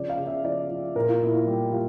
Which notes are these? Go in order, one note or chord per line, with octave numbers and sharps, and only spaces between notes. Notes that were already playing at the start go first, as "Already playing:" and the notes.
Already playing: C#3 F3 D5
F5
C#3
E5
F3 D5
F3
A#2 A#4
F4
A#2 E4
F4
G3 G4
G3 F4